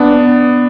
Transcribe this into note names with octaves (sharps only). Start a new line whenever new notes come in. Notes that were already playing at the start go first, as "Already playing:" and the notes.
Already playing: B3 D4